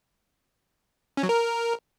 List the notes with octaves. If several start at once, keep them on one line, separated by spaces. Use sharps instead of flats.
C#4
F#3
A#4